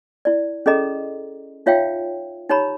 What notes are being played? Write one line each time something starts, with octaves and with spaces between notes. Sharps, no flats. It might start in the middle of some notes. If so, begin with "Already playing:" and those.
E4 D5
C#4 G#4 A4 D#5 A#5
D#4 F4 C#5 E5 F5 G5
D#4 G4 C#5 A#5 B5